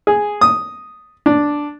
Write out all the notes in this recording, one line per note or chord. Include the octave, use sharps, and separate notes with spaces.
G#4
D#6
D4